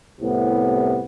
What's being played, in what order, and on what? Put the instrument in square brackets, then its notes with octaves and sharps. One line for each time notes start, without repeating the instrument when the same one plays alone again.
[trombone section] C2 A2 C3 B3